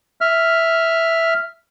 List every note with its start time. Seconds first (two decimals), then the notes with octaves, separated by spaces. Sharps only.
0.21 E5 F6